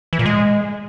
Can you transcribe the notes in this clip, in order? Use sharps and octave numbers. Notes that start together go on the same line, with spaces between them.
E3
A#2
G#3